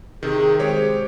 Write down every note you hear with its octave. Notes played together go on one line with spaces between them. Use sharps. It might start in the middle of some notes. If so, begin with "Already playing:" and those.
C3 D#3 G#4
G#3 G4 C5 C#5